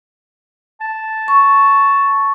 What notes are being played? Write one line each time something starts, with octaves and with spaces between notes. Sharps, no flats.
A5
C#6